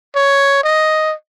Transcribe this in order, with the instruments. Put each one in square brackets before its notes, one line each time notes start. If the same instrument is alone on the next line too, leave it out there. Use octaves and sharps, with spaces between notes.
[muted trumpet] C#5
D#5